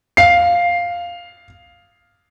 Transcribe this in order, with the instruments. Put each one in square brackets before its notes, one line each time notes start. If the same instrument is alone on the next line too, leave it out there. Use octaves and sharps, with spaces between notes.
[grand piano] F5 C7